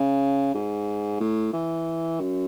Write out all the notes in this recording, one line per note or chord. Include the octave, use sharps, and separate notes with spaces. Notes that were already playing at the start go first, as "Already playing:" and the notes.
Already playing: C#3
G#2
A2
E3
F#2